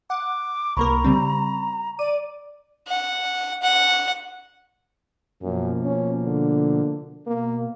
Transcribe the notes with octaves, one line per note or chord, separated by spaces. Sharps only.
F#5 D6
C2 A#3 A#4 A#5 B5 C#6
C#3 G3 C4
D5 D6 D#7
F#5
F#5
F#2 B2 F3 A#3
C#4
D3
B2 A#3